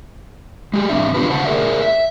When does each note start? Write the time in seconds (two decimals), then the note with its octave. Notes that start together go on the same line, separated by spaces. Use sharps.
0.74 G#3 G4
0.89 E2 G3 C4 D4 E5
1.14 C4 D4 F4 G4 B4
1.30 C#3 C5 F#5 A5
1.45 G#4 A#4 D5 E5
1.82 E5